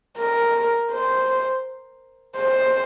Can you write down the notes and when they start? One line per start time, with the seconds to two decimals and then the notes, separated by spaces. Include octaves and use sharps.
0.18 A#4
0.92 C5
2.37 C5